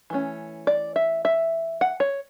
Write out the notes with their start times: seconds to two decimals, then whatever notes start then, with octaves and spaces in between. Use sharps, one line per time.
0.10 E3 A3 C#4
0.67 D5
0.96 E5
1.25 E5
1.81 F#5
2.00 C#5